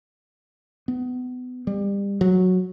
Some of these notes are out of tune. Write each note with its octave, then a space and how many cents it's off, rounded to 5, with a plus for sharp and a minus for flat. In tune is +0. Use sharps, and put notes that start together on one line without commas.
B3 +25
G3 +30
F#3 -10